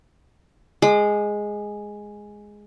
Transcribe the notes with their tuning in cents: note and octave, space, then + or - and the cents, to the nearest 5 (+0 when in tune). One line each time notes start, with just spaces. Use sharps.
G#3 +0 D6 +40